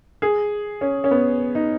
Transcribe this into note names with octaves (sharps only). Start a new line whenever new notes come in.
G#4
C#4
C#4
B3
D#4